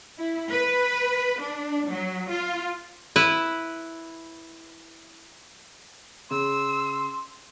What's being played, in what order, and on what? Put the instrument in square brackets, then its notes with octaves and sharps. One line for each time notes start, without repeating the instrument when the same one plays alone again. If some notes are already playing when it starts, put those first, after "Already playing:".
[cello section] E4
B4
D4
F#3
F4
[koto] E4 B4
[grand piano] C#3 [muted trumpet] C6 [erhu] E6